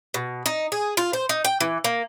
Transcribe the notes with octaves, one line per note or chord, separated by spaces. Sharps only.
B2
D#4
G#4
F4
C5
D#4
G5
E3
A#3